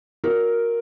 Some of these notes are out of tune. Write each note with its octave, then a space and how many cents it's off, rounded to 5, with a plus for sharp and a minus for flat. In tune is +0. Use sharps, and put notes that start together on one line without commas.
F#4 -30 A#4 +0